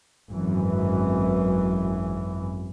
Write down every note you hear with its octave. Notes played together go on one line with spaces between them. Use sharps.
G#1 F#2 E3